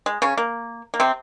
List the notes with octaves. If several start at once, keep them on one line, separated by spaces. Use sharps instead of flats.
G#3
C#3 C#4
A#3
A#3
C3 C4